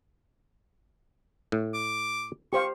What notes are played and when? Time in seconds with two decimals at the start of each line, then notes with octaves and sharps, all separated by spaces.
1.52 A2
1.74 D6
2.53 G4 C5 F5 C#6